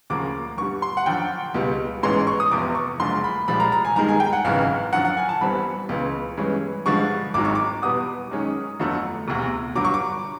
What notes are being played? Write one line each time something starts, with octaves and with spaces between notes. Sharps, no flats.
D2 C#3 F3 A#3 D6
G2 D3 G3 C#6
C6
F#5
F#2 D3 F3 G5
C#2 B2 G3
A1 G#2 E3 G#3 C#4 C6
C#6
D#6
F1 E2 C3 F3 D6
C#6
F#1 F#2 D3 F3 G#3 C6
B5
C2 A#2 F3 G#3 B5
A#5
A#5
G#5
G2 D#3 G#3 A#5
G#5
G5
F#5
G#1 F#2 C#3 E3 F5
F#2 D3 F3 F#5
F#5
G#5
A5
G1 G2 E3 G3 C4 B5
C#2 C#3 E3
G2 E3 G#3 C#4
G2 D3 F3 G#3 C#6
G#1 G#2 D#3 F#3 D6
C#6
D6
E2 B2 G3 B3 D#6
F#2 D#3 G#3 C#4
G1 F2 D3 F#3 A3
E1 D2 C3
G2 D3 F#3 D6
C#6
D6